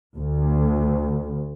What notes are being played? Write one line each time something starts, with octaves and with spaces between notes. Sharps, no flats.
D2